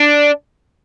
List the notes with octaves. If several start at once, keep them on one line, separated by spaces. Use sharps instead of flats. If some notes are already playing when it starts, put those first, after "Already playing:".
Already playing: D4